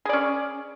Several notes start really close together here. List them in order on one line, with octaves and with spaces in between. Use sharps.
G#4 D5 C#4